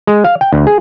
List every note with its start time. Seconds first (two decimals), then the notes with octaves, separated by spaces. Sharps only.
0.07 G#3
0.24 F5
0.41 G5
0.53 D2
0.67 G#4